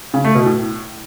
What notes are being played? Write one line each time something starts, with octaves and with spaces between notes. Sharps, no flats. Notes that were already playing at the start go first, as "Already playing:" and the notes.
C#3
A3
B2
A2